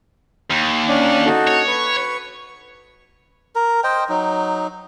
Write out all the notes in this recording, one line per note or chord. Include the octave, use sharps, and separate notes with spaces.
D#2
C#4 D4 D5
D#4 F#4 A4
C#5
B4 C#6
A#4
C5 D#5 G5
F#3 D#4